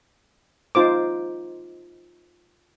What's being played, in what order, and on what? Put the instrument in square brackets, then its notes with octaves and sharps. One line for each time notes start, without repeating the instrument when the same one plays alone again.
[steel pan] D#4 F4 C5 D6